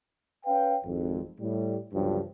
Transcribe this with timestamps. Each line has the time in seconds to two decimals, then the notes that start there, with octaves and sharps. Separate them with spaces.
0.45 C#4 B4 F5 G5
0.83 G#1 F2
1.40 A2 G3
1.92 G1 C#2 G2 D3 F3 F#3